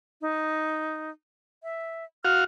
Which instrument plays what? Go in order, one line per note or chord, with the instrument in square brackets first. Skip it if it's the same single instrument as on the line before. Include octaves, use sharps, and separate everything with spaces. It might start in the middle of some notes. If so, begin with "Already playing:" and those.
[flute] D#4
E5
[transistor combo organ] F#4 F5 [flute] F6